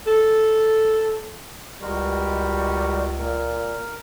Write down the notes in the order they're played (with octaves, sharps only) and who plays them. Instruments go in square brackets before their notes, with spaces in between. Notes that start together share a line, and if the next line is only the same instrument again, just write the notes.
[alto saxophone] A4
[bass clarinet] C#2 [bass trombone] G3 [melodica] G#3 F#4 A#4
[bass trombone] A#2 [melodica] A#4